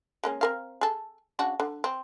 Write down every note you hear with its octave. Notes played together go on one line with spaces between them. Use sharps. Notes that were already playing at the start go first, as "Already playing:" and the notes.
G#3 A#3 C#4
C4 A#4 F5
G#4 A4
C#3 D4 F#4
D3
C4